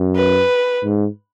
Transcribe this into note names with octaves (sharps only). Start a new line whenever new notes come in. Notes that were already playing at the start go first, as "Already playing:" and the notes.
Already playing: F#2
B4
G#2